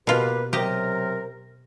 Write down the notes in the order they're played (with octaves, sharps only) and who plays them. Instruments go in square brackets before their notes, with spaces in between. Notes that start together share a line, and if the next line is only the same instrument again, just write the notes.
[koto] B2 F4 [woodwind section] A#3 G4 B4
[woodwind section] C3 F#3 A#4 [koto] G4 D#5